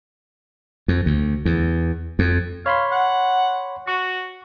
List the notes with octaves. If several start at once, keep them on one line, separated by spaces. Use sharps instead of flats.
F2
D2
E2
F2
C#5 F5 B5 C6
F#5
F#4 C#6